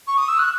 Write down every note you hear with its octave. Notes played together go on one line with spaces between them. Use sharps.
C#6
D#6
E6
F#6